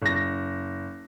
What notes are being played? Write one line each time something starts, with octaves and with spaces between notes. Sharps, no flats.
F#1 A#6